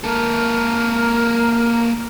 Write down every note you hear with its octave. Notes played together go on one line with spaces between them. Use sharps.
A#3 A4 A#4